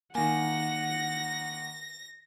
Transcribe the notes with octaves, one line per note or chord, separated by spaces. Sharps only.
D#3 A#3 F#5 G#5 A#6